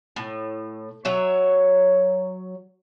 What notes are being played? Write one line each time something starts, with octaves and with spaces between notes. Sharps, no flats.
A2
F#3 C#5 E5